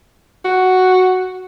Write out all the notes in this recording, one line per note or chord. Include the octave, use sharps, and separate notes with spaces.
F#4